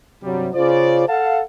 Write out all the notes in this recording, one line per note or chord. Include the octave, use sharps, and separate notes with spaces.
G2 C3 F#3 G3
C#3 F4 C5 D5
A4 F5 F#5 A5